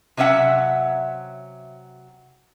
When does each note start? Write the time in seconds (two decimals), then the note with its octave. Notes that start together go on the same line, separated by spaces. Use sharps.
0.17 C3 F#3 C#4 E5 F#5